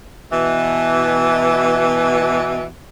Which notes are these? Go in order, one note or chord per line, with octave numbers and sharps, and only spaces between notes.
B2 E3